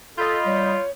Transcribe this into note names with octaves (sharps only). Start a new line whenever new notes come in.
F4 A4 D#5 B5 G6
G3 C#5